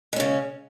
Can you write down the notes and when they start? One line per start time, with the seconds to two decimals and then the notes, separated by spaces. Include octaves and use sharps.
0.13 G#3
0.16 C#4
0.20 C#3